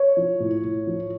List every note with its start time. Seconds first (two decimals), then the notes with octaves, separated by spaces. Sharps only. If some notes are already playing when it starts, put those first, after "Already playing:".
Already playing: C#5
0.17 F3
0.40 A2
0.64 A2
0.87 F3